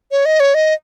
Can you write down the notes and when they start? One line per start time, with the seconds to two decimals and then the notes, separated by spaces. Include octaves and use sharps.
0.11 C#5
0.25 D#5
0.40 C#5
0.54 D#5